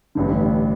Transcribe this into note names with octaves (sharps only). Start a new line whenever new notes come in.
A1 G2 D3